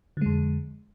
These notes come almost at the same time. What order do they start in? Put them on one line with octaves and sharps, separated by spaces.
D3 G#3 F2